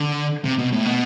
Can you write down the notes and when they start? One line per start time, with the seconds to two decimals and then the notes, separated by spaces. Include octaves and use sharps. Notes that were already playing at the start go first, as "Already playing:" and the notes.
Already playing: D3
0.44 C3
0.58 B2
0.73 A2
0.86 B2